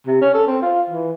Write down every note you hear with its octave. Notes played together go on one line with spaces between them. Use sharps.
C3
C#4
A4
C4
F4
E3